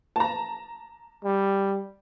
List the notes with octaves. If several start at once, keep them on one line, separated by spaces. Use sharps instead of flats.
A5 A#5
G3